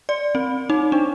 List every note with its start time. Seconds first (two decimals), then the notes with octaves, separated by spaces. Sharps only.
0.09 D5
0.35 C4
0.70 D#4
0.92 D4